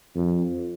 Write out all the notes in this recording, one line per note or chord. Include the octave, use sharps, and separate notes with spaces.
F2